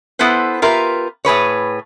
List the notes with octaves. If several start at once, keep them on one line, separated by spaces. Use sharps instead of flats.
B3 E4 A4 B4 C5
F4 G4 A#4 B4 E5
A2 G#4 B4 C#5